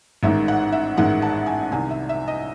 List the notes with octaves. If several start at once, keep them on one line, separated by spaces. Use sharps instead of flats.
A1 G#2 D#3 G#3 E5
F#5
E5
A1 G#2 D#3 G#3 F#5
A5
G#5
C2 C3 D#3 G#5
E5
E5
D#5